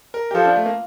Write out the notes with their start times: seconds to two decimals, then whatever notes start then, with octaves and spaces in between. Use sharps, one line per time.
0.14 A#4
0.31 G4
0.35 F3 A4
0.45 D4
0.56 A3
0.66 A#3